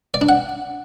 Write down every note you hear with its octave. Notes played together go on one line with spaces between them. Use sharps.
D5
D4
F#5